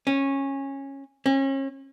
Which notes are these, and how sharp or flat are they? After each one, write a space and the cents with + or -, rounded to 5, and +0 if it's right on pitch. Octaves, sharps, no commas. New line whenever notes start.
C#4 -15
C#4 -35